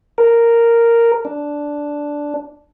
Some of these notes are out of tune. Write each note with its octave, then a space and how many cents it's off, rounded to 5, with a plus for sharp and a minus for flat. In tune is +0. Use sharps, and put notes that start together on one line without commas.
A#4 -5
D4 -5